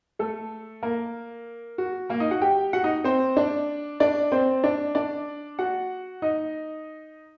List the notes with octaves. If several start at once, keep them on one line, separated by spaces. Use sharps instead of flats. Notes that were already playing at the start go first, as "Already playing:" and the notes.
A3 A4
A#3 A#4
F#4
A#3 A#4
D#4 D#5
F#4 F#5
G4 G5
F#4 F#5
D#4 D#5
C4 C5
D4 D5
D4 D5
C4 C5
D4 D5
D4 D5
F#4 F#5
D#4 D#5